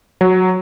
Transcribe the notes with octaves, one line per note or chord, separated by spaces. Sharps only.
F#3